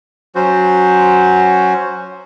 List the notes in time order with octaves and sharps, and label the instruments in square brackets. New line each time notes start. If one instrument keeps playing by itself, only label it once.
[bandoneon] F#3 C#4 F#4 C5